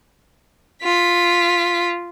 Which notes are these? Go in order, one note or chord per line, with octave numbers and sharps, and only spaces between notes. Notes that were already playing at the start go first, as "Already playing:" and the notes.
F4 B6